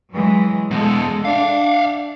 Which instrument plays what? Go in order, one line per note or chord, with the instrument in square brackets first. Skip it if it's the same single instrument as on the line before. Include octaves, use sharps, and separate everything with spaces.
[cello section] E3 F#3 G#3
[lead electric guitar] E2 B2 [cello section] G#3 A4
[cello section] D4 [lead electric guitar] E5 F5